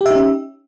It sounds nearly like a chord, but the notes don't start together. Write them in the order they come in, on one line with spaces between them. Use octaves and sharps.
G4 E5 D#4 C#4